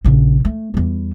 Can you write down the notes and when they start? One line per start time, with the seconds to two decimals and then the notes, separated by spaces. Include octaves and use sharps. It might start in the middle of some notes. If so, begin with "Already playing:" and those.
0.04 A#1 C#3
0.45 A3
0.74 E2 G3